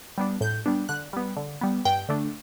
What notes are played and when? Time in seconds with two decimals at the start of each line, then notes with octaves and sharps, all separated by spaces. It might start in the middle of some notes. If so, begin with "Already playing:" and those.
0.18 G3 B3 D4
0.41 A2 G6
0.66 G3 B3 D4
0.89 D3 F#6
1.13 G3 B3
1.37 D3
1.61 G3 B3
1.85 G2 G5
2.09 D3 A3 D4